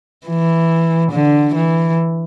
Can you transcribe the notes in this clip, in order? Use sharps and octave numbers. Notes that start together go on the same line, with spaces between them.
E3
D3
E3